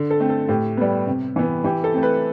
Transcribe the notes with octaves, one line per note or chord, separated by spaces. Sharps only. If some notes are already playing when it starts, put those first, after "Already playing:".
Already playing: D3
A4
A3 C4
A4
A2 G4
G3 B3
C3
E3 B3
E3 G4
A4
A3 C4
B4